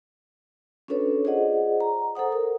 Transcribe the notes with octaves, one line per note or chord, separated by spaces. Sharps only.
C#4 D4 F#4 A4 B4 C#5
F4 G#4 C5 D5 D#5 F#5
A#5
A4 C5 F#5 D#6
A#4